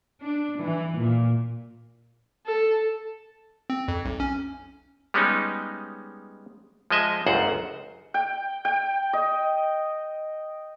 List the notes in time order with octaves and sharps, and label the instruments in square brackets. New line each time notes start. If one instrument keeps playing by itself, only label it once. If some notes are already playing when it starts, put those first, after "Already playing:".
[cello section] D4
E3
A#2
[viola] A4
[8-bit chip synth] C4
F2
B1
C#4
[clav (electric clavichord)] G3 G#3 B3 C#4 D#4
F3 G#3 D#5 E5
G1 C#2 F#2 C5 F#5
[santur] G5
G5
D#5